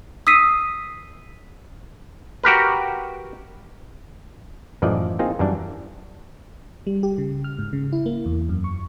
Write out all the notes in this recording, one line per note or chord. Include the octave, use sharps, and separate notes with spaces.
D#6 E6 B6 C7 D#7
F#4 G4 A#4 B4
F#2 A2 E3 F3 D5 D#5
A#3 C4 D#4 F4 G#4
F#2 E3 G3 D4
G3
G4
C#3
F6
G#2
C#3
E4
A#3
E2
F#2
C#6